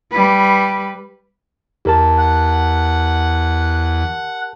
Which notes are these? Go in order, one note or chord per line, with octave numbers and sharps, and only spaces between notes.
G3 B4
E2 G4 A#4 A5
F#5